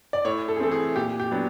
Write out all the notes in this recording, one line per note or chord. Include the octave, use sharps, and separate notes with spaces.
D5
A2 C#5
A4
G#4
E3 A3 C4 A4
G#4
A#2 G4
G4
F#3 B3 D4